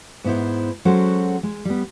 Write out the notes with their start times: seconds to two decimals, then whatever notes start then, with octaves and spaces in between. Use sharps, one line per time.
0.24 G#2 B3 E4 C5
0.85 F#3 G#3 C#4 F#4 A4 C5
1.43 G#3
1.65 G3 B3